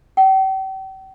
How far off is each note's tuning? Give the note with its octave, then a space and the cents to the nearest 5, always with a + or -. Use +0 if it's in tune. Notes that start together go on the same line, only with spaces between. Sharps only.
G5 -40